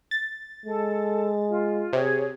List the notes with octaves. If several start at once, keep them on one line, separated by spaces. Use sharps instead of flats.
A6
G#3 A4
F4
C3 G#4 C#5